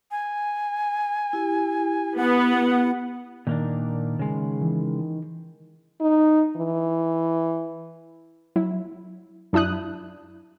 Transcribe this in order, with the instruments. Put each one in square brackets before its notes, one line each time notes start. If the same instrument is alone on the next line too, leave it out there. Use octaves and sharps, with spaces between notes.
[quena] G#5
[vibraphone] E4 G4
[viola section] B3 [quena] F#5
[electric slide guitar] A#2 A#3 D4 [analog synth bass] D#3
[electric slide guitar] C#3 G#3
[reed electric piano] E3
[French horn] D#4
E3
[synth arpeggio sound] F#3 E4
F#2 D4 E4 D#6 F#6